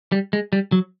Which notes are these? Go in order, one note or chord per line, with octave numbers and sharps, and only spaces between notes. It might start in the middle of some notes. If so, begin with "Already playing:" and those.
G3
G#3
G3
F#3